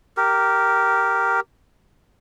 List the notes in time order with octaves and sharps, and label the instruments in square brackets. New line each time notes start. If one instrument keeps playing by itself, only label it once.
[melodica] G4 A#4